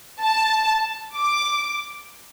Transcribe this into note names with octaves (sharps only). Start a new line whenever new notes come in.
A5
D6